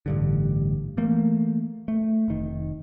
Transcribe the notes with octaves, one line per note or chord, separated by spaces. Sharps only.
A1 G2 D3
E3 A3 A#3
A3
F1 D#3